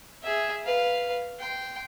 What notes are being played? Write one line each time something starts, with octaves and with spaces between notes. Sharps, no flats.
G#4 E5
B4 F5
G5 C6